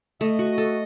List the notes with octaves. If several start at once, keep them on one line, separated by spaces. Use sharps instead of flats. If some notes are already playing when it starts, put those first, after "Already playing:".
A3 D#5
F#4
A4